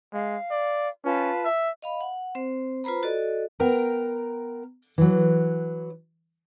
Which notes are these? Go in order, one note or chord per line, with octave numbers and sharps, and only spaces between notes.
G#3 F5
D5
C#4 F4 B4 A5
E5
D#5 F5 B5
F#5
C4 C5
F4 B4 C5 A#5 B5
F#4 A4 D5 D#5
B3 A#4 G5 A#5
E3 F#3